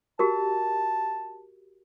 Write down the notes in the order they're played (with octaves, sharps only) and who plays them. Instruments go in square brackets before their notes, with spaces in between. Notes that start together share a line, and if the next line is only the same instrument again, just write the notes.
[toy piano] F#4 G4 A#4 [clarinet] A5